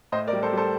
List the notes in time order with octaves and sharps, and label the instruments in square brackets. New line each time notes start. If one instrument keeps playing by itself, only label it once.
[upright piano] A2 C5 D#5
A#4 D5
G3
A4 C5
G3 A4 C5